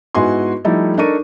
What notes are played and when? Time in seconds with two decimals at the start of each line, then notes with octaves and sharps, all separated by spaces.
0.15 G#2 B3 E4 F#4 G#5 C6
0.64 F3 G3 A3 D#4 E4 A4
0.97 D4 D#4 A4 A#4 C#6 D#7